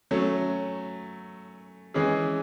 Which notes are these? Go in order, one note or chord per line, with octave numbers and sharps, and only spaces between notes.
F#3 A3 C#4
E3 G#3 C#4 G#4